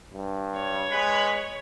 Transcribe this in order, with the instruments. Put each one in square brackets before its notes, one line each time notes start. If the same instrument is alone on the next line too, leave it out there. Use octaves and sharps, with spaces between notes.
[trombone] G2
[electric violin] C#5
[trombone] G#3 [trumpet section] B4 B5